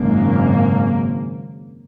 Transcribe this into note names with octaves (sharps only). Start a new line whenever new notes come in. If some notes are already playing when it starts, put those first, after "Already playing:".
Already playing: G#1 F#2 C#3 A#3